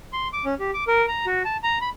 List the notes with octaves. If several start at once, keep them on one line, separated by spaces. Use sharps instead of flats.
C6
D6
C#4
G4
D6
A#4
A#5
F#4
A5
A#5
B5